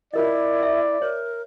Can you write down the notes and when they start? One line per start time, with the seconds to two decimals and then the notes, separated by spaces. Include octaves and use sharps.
0.14 E4 F4 A#4 D5 D#5
0.63 E5
1.02 A#4 C#5